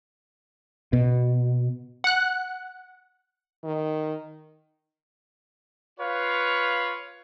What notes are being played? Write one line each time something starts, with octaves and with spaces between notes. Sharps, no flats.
B2
F#5 F#6
D#3
F4 B4 C#5 F5